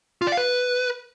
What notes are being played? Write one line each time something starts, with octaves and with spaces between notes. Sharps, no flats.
F4
D5
F5
B4